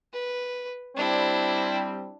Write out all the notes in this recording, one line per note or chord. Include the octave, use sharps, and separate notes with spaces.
B4
G3 C4 D4 E4